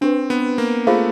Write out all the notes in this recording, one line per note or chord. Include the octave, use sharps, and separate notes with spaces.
C4 D4 G4 B4
B3
A#3
A3 F4 G#4 C5 F5